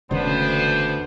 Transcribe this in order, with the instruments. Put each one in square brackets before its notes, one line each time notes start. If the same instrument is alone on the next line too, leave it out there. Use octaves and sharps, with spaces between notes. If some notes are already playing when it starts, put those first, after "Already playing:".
[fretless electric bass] E1 C#3 [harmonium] D2 [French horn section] B3 D4 C5